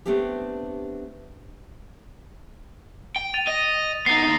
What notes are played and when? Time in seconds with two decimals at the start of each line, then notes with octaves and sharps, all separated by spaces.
0.05 A3 B3 C4 D4 G4
3.16 G5
3.34 A6 D#7 F7
3.47 D#5 D#7
4.06 B3 D#4 A6 C7
4.24 D#2 D#4